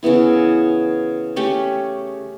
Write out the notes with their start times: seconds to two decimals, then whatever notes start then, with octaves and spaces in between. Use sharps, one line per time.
0.03 C#3 E3 B3 E4
1.36 A3 C#4 G4